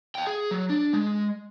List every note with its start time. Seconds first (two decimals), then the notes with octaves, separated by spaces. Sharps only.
0.15 F5 G5
0.27 G#4
0.51 F#3
0.69 D4
0.93 G#3